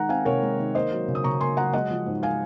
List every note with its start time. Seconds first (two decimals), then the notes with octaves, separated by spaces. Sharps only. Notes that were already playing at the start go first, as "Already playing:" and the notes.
Already playing: D#3 G#3 F#5 A#5
0.09 C4 F5 G#5
0.25 C3 A#4 C#5
0.43 G#3
0.59 D#3
0.75 A#3 C5 D#5
0.91 F#3
1.08 C#3
1.15 D#6
1.24 C#3 A#5 C#6
1.40 A#3 G#5 C6
1.57 F#3 F#5 A#5
1.73 G#3 D#5 F#5
1.90 F3
2.06 G#2
2.23 F5 G#5